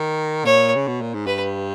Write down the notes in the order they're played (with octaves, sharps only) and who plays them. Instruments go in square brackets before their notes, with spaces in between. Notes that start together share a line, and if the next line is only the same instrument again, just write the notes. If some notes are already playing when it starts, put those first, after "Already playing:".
Already playing: [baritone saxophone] D#3
[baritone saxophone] A#2 [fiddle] C#5
[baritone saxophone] C#3
B2
A#2
G#2
[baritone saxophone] G2 [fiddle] B4